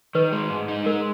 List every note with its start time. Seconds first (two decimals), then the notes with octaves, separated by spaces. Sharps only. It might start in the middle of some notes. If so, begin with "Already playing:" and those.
0.15 D#3 B4
0.32 G#3
0.50 G#2
0.68 D#4
0.86 G#3 A#4